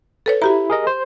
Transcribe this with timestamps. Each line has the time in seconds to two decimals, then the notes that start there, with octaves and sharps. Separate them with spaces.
0.26 A4 B4 C#5
0.42 E4 F#4 G4 A#5
0.70 G#4 A#4 D#5
0.87 C5